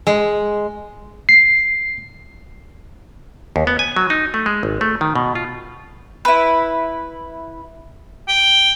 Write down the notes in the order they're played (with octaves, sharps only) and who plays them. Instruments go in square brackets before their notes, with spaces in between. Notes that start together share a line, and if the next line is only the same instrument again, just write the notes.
[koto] G#3
[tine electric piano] C7
[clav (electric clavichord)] D#2
B3
G#5
F#3
D#4
A3
G#3
G#1
A3
D#3
B2
F4
[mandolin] E4 B4
[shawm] G5